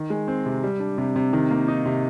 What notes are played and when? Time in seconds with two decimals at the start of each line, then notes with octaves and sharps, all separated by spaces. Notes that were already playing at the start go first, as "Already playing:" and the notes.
Already playing: D#3
0.10 G#3
0.28 C4
0.46 C3
0.63 G3
0.80 D4
0.98 C3
1.16 C3
1.33 D#3
1.51 A#3
1.68 D#4
1.85 C3